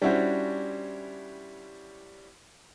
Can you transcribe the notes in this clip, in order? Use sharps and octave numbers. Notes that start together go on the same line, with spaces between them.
G3 C#4 D4 E4 F#4 C5